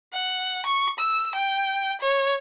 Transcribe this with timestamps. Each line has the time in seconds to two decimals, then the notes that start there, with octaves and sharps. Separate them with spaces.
0.13 F#5
0.66 C#6
0.99 E6
1.36 G5
2.01 C#5